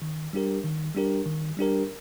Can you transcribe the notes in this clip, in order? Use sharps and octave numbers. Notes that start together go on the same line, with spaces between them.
D#3
G3 D4 G4 A#4
D#3
G3 D4 G4 A#4
D#3
G3 D4 G4 A#4